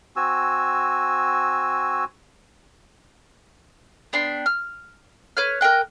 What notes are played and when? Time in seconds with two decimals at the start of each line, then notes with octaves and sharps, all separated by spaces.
0.16 C4 F#4 G#5 E6
4.13 B3 D4 G5 C6
4.46 F6
5.37 B4 C#5 F6
5.61 A#4 D#5 G5 F#6